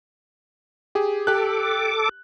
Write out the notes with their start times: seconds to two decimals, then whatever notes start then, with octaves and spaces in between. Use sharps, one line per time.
0.95 G4 G#4
1.27 G4 A4 D6 F#6